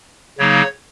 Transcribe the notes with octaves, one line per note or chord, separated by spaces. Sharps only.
C#3 F#3 A#3 D#4 C#5